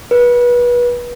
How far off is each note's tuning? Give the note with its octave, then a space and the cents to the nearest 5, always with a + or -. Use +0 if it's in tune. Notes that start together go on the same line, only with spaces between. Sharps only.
B4 -30